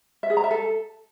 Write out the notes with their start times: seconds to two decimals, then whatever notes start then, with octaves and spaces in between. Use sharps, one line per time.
0.23 E5
0.30 G#4
0.37 A#5
0.44 E5
0.51 A4